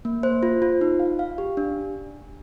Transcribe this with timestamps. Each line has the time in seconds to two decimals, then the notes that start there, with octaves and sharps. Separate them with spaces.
0.05 A#3
0.23 C5
0.43 F4
0.62 F4
0.81 D#4
1.00 F5
1.19 F5
1.38 G4
1.57 D4